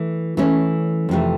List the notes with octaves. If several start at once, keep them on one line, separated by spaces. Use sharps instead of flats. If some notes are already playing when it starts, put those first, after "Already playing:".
Already playing: E3 A3
E3 A3 C#4
F2 C3 E3 A3